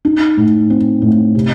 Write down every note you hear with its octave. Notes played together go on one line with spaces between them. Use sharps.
D#4
A2
C4
A2
C3